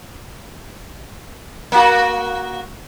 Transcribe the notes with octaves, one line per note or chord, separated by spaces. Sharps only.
A#3 F#4